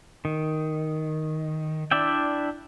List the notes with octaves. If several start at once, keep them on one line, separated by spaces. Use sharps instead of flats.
D#3
D4 E4 D5 E5 G5